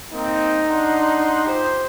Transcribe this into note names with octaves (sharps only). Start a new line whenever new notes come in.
A#3 C4 D#4
D4 F#5 C6
F4 G4 C5